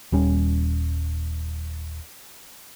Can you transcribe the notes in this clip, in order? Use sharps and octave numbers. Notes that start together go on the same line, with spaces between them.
D#1 G3 C#4